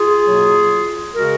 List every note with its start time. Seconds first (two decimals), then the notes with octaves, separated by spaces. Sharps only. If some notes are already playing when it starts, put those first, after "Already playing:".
Already playing: F4 G#4
0.23 B2 F#3 A#3
1.15 C#3 G#3 F#4 A#4